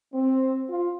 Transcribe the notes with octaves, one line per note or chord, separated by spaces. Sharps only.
C4
F4